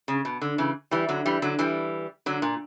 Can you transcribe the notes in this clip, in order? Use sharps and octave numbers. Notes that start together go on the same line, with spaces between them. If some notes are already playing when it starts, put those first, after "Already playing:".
C#3
B2
D3
C#3 E3
E3 G3
D3 F#3
E3 G3
D3 F#3
E3 G3
D3 F#3
A#2